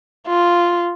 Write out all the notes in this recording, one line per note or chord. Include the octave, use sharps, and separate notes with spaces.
F4